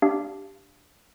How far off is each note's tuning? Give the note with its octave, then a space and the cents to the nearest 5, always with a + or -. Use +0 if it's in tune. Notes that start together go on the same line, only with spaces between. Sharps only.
D4 +0 G4 +0 F5 -15